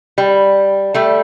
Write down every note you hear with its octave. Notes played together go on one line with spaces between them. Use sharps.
G3
G3 A3